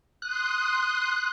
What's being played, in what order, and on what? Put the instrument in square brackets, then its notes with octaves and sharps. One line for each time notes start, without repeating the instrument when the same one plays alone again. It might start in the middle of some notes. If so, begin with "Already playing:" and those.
[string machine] C6 D#6 [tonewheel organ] F#6